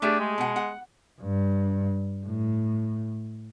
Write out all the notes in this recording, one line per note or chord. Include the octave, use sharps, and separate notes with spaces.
A3 D4 G4 G#4
G#3
B2 F#5
F#5
G2
A2